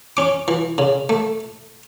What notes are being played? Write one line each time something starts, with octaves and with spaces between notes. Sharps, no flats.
C#4 D6
E3
C#3
A3